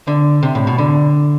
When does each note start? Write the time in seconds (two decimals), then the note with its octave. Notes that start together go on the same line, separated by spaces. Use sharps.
0.07 D3
0.43 C3
0.55 A2
0.67 B2
0.78 D3